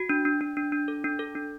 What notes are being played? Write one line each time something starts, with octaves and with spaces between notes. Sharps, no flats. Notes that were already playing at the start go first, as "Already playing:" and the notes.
Already playing: F#4
D4
D4
D4
D4
D4
A4
D4
A4
D4